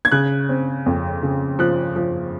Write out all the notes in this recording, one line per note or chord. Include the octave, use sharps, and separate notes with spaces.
G#6
C#3 F#6
C4
F2
C#3
F3 F#6
F3